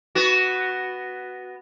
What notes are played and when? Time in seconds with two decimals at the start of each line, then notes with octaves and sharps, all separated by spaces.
0.15 B3 F#4